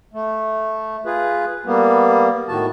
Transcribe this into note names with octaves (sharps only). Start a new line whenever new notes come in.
A3
F4 G#4 B4
G3 A#3 B3
A2 D#3 F#4 A5